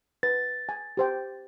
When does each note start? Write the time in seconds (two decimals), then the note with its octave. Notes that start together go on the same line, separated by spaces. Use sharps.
0.23 B4 A6
0.69 G#5
0.97 G4 C5 G5